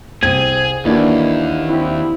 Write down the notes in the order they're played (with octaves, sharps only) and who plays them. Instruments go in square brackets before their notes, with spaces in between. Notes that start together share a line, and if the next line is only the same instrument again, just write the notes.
[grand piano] C2 G#6 D#7 [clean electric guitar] C4 [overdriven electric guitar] G#4
[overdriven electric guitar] D#2 [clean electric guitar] E3 [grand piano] A#3 D4 F#4
[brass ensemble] C4 E4